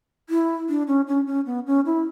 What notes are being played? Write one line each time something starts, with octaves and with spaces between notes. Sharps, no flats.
E4
D4
C#4
C#4
C#4
B3
C#4
E4